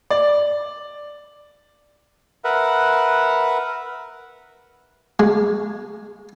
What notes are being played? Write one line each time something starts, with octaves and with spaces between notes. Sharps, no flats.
D5
A#4 B4 E5 F#5
G#3